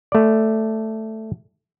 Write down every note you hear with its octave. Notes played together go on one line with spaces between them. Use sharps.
A3 D5